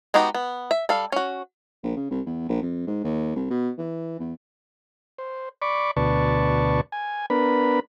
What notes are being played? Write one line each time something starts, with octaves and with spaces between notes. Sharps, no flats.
G#3 B3 D#4 F#4 G4
B3
E5
G3 A4 F5
C#4 F#4
A#1
C#3
C2
E2
A#1
F2
G#2
D#2
C2
B2
E3
E2
C5
D5 B5 C#6 D6
D2 B2 B4 D5 A5 C#6
G#5
B3 D4 A#4 B4 B5